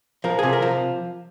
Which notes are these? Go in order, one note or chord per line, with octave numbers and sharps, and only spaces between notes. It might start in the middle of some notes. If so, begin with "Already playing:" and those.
F3 A#4
C3 G#4
A#4
F3